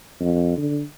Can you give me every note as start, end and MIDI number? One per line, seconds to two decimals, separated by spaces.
0.20 0.55 41
0.57 0.82 50